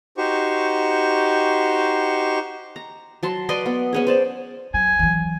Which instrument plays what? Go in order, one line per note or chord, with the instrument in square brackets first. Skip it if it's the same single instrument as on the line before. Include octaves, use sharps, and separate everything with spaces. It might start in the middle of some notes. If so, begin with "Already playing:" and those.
[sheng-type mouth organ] D#4 F#4 G4 C5 C#6
[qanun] A#5
F#3 A5 C6
B4 D5 D#5 C6
B3
B3 C#4 G#4
C5 D5 A5
[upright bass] F#3 [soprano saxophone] G#5
[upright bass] E3 F#3